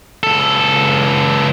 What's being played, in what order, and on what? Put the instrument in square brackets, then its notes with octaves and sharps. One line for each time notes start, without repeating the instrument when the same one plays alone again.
[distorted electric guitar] C#2 A4